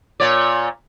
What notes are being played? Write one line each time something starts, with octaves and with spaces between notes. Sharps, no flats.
A#2 C#5 D5